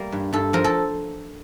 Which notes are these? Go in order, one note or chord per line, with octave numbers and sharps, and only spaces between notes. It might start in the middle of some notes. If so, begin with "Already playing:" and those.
Already playing: G3 A#3
G2
G2 A4
F3 A#4
A4